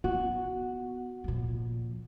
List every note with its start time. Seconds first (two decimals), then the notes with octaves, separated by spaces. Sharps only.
0.04 B3 F#4
1.24 A#2 F3